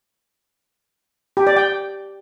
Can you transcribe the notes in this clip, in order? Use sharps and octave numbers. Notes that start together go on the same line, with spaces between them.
G4
D5
G5